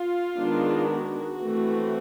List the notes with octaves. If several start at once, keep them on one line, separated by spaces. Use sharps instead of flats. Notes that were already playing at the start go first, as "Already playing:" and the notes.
Already playing: F4
D#3 G#3 B3 D4
F#4
E3 A3 C4